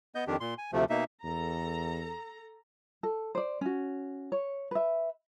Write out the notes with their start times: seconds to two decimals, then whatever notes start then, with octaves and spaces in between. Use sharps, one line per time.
0.15 B3 D#5 G6
0.27 F2 D#3 D4 G4
0.40 A#2 C6
0.58 G#5
0.73 D2 C3 F3 A3
0.90 B2 A#3 D#4 E5
1.24 E2 A4 A#5
3.03 A4
3.35 C5 D5
3.61 C#4 F#4
4.32 C#5
4.71 B4 E5